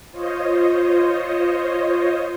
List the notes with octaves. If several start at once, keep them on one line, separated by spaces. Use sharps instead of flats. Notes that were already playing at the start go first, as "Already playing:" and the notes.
F4 C5 C#5 D#5